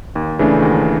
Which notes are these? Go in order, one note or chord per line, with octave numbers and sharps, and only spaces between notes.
D#2
C#3 E3 A3 D4
D#2